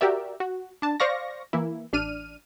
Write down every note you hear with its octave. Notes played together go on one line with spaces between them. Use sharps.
F#4 G4 A#4 D5 E5
F#4
D4 A5
C5 D5 F5 C#6 A#6
E3 A#3 E4
A1 D4 F6 D#7